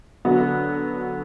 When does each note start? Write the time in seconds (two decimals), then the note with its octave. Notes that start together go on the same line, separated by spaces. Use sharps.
0.25 D3 F#3 B3 F#4